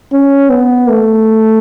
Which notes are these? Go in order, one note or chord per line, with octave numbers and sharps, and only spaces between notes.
C#4
B3
A3